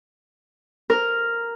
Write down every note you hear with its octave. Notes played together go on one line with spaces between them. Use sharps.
A#4